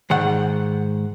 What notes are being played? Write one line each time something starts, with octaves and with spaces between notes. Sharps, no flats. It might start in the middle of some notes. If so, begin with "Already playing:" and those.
G#2 D#3 F#5